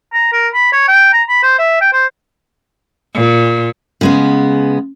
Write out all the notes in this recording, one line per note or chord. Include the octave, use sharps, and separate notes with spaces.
A#5
A#4
B5
C#5
G5
A#5
B5
C5
E5
G5
C5
A#2
C#3 G#3 B3